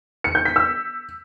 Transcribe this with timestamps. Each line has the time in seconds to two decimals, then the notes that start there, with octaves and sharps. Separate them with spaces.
0.24 C#7
0.35 G6
0.45 B6
0.56 E6